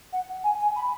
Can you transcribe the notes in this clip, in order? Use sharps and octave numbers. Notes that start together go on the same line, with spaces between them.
F#5
G#5
G#5
B5